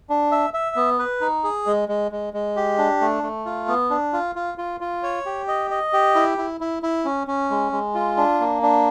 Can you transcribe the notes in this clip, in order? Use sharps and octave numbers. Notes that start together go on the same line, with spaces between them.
D4
E5
E5
B3
B4
D#4
G#4
G#3
G#3
G#3
G#3
G4
D4
A3
A3
F4
B3
D4
F4
F4
F4
F4
C#5
G4
D#5
D#5
G4
E4
E4
E4
E4
C#4
C#4
G#3
G#3
F4
D4
A#3
D4